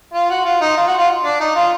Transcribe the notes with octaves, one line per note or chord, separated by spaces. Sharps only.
F4
F#4
F4
D#4
F4
F#4
F4
D4
D#4
F4